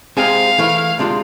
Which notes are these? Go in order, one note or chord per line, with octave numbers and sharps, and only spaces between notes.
C2 C3 G#3 C4 G#4 F5
E3 A3 E4
D2 C3 G#3 D4 F4